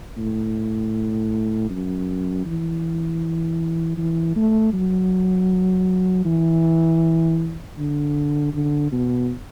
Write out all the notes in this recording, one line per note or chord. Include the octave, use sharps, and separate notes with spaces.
A2
F#2
E3
E3
A3
F#3
E3
D3
D3
B2